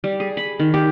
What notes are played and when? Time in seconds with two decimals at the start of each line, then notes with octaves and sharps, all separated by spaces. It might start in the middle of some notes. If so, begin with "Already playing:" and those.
0.04 G3
0.20 G#4
0.37 B5
0.59 D#3
0.74 G4